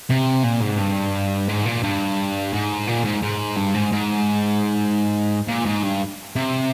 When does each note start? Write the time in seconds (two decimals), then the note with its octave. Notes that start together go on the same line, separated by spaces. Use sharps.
0.10 C3
0.44 A#2
0.62 G#2
0.79 G2
1.49 G#2
1.65 A#2
1.83 G2
2.54 G#2
2.87 A#2
3.05 G#2
3.23 G#2
3.57 G2
3.74 G#2
3.92 G#2
5.48 A#2
5.66 G#2
5.83 G2
6.36 C3